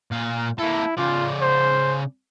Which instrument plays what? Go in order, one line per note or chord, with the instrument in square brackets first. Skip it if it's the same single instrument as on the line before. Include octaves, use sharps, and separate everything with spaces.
[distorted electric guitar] A#2 F5
[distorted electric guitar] A#3 A4 [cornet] E4
[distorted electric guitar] C#3 D5 [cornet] F4
[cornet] C5